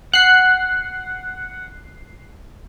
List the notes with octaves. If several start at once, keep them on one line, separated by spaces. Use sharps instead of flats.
F#5 F#6 C7